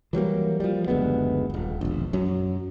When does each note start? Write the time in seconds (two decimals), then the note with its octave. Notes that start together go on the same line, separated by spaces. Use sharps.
0.13 E3 F#3 G3 A#3
0.60 F3 G3
0.88 F#1 D2 G#3 B3
1.50 D#1 G#1
1.81 E1 A#1
2.13 F#2 F#3